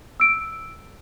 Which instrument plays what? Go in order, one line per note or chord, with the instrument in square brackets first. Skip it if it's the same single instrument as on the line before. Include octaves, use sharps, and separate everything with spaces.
[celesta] E6 D7